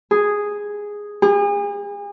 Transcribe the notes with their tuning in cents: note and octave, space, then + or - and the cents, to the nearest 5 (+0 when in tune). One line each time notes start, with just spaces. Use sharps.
G#4 -5
G#4 -40